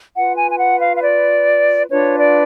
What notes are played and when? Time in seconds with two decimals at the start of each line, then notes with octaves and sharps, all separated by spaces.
0.15 F4 B4 F#5
0.37 G#5
0.51 G#5
0.59 F#5
0.81 F5
0.95 F5
1.03 D5
1.90 D4 F4 B4 C#5
2.19 D5